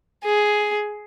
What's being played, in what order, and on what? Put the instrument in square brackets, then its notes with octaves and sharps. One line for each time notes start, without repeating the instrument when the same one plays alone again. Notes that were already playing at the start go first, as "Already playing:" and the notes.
[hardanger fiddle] G#4